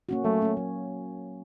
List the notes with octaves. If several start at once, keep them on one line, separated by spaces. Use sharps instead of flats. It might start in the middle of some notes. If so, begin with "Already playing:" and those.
A#3 C#4 F#4
F#3 A3
A#3 C#4 F#4
F#3